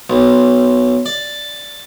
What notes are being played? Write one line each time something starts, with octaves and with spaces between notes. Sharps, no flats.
B1
D5